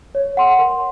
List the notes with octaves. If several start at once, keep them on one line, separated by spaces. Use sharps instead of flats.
C#5
F#5 C6
A#4